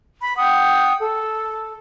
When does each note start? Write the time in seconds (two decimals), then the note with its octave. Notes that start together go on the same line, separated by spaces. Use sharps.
0.20 B5
0.37 F#5 G5 D#6
1.00 A4